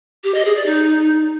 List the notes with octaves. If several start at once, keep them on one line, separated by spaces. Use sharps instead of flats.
G4
D#5
G#4
D5
D#4